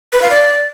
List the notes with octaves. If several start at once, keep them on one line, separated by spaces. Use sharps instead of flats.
B4
F5
D5